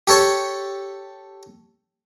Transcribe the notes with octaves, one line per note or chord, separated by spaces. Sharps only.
G4 A4 C#5 A5 C#6